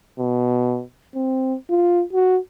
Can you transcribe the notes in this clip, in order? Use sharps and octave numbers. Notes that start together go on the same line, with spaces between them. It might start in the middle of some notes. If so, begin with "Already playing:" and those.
B2
C4
F4
F#4